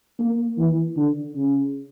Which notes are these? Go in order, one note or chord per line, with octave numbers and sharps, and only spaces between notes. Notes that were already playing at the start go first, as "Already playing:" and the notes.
A#3
E3
D3
C#3